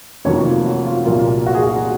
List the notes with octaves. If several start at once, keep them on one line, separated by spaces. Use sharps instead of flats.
F1 F2 D#3 F#3 A#3 C#5
F4
F#4
F4
C2 A#2 F#3 A#3 F4
F#4
G#4
F#4